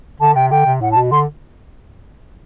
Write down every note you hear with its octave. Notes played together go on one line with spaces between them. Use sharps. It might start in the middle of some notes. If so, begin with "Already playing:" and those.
D3 A5
C3 G5
D3 G5
C3
A2 F#5
A5
B2
D3 C6